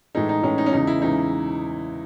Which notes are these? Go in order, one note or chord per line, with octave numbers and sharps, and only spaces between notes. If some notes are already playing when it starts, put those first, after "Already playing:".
A2 E3 G#3 D#4
D#4
A2 E3 G#3 C#4
D#4
C#4
E2 C#3 E3 G#3 D#4
E4
E2 C#3 E3 G#3 D#4